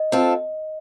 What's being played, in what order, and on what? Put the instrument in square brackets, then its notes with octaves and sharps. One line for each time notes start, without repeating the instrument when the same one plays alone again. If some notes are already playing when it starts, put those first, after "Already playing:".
Already playing: [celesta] D#5
[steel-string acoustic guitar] C4 F4 A4